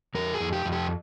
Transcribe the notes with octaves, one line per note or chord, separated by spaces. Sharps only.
F2 A#4
G#4
F2
G4
F2
G4